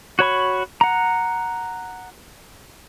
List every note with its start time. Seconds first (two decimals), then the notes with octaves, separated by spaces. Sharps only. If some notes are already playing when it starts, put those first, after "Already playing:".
0.19 F#4 C#5 B5 C#6
0.81 F#5 A#5